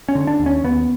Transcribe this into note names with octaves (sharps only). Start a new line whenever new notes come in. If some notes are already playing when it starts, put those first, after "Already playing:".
C#4
D3
D4
D#2
C#4
D#2 B3